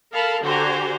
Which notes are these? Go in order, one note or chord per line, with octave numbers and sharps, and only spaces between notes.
A4 A#4 F5 A5 B5
D3 F#4 G4 C5 G#5 A#5